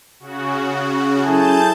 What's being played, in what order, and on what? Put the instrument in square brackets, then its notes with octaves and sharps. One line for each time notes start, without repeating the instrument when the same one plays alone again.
[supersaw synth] C#3 F#4
[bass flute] C#4
[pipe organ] F#3 E4 A4 [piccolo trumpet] G#4 [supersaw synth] A5 G6 A6